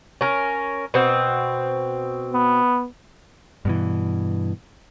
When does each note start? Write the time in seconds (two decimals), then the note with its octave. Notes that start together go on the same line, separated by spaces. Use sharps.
0.21 C#4 A#4
0.94 B2 C4
2.33 B3
3.65 G2 B2 E3